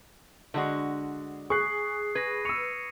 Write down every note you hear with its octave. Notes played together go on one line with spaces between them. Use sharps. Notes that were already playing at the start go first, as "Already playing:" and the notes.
D3 G#3 D4 F#4
G#4 C#6 D#6 F#6 C7
B4 G#6 A#6
C#6 E6 C#7 D#7 F7